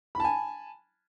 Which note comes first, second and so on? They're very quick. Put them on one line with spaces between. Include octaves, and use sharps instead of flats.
B5 A5 G#5